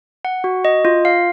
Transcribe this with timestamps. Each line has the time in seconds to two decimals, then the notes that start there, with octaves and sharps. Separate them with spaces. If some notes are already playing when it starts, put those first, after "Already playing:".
0.25 F#5
0.44 F#4
0.65 D#5
0.85 F4
1.05 F5